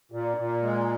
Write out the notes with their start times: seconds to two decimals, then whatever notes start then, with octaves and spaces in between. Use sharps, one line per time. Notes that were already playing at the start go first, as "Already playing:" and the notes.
0.12 A#2 D5
0.37 A#2
0.62 G#3